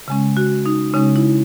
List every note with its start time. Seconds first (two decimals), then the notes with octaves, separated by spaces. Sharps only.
0.08 C#3 G#3 C#4
0.37 F#4
0.66 D#4
0.94 C#3 G#3 C#4 D#4
1.16 E4